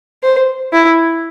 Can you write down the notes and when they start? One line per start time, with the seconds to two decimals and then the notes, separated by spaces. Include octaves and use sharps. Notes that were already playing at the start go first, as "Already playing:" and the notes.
0.23 C5
0.73 E4